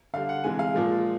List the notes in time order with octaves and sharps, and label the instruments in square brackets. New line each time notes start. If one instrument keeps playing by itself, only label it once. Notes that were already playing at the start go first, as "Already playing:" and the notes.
[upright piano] D3 G3 F5
F#5
C3 E3 G#3 G#5
F5
A#2 F3 G#3